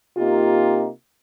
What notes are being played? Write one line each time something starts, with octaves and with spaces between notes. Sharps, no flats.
C3 A#3 D#4 F4 G4